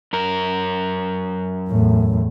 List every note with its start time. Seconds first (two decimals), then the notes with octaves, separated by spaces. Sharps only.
0.13 F#2 A#4
1.69 E2 A2